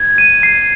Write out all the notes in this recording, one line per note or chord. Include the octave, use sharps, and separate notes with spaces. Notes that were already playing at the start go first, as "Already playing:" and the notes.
Already playing: G#6
D#7
C7